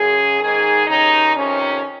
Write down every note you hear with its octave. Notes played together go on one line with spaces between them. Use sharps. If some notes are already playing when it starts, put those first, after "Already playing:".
Already playing: F#2 C#3 G#4
G#2 D#3 G#4
D#2 C#3 D#4
F2 C3 D#3 C#4